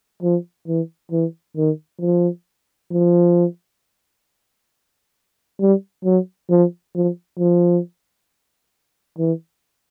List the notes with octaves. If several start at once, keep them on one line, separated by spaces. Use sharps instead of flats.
F3
E3
E3
D#3
F3
F3
G3
F#3
F3
F3
F3
E3